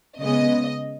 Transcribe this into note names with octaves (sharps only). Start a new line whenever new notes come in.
C#3 G#3 B3 D#5